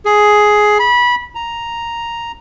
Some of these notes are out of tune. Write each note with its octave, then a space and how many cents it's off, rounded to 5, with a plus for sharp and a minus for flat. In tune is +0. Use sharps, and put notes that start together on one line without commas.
G#4 +10
B5 -20
A#5 +0